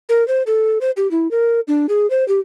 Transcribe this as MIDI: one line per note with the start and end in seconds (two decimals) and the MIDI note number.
0.09 0.26 70
0.28 0.43 72
0.47 0.78 69
0.81 0.91 72
0.97 1.10 67
1.11 1.30 64
1.31 1.60 70
1.68 1.86 62
1.89 2.09 68
2.10 2.26 72
2.28 2.40 67